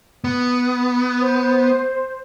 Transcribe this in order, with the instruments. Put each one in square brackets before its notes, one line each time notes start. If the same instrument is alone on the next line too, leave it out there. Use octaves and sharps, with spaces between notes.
[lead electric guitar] B3
[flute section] C5